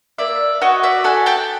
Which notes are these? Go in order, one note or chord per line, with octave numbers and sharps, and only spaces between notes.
A#3 D5 E5
F#4 C#5 D#5
D5 E5
A4 F#5 G#5
G5 A5